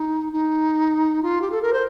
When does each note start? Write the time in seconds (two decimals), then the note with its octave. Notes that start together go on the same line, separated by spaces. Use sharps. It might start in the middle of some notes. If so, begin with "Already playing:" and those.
Already playing: D#4
0.33 D#4
1.23 F4
1.41 G4
1.51 A4
1.62 A#4
1.73 C5